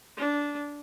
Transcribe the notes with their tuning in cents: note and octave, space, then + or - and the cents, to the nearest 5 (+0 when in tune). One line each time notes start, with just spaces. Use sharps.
D4 -15